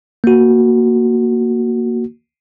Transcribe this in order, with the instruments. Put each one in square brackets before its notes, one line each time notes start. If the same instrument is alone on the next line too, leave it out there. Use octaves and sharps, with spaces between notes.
[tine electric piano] A#3 F#4